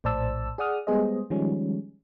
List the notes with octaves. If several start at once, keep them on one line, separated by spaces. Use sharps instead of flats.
A#1 A2 C5 D5 A5 E6
G#4 D5 F#5 D#6 F6
G3 G#3 B3 G#4 C5 D#5
D#3 F3 G3 G#3 C#4